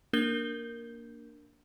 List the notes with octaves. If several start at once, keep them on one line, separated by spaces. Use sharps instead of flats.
A#3 D4 A#4 G6 G7